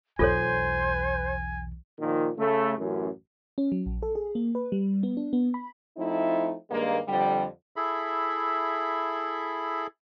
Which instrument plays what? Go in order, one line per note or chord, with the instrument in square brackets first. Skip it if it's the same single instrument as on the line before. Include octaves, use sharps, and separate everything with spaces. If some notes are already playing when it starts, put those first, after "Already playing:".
[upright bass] B1 E2 [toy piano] F4 A4 C#5 [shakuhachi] C5 [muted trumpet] G#5
[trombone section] A#2 D#3 F3
C#3 A3
A1 F#2
[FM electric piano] C#4
F#3
A#1
A4
G#4
A#3
B4
G3
B3
D4
B3
B5
[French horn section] F3 A3 C4 D#4 E4
G2 D#3 G#3 A#3
F2 D3 G3
[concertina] E4 G#4 A4 E5 B5